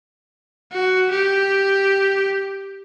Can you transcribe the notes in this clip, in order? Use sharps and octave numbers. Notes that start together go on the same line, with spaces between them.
F#4
G4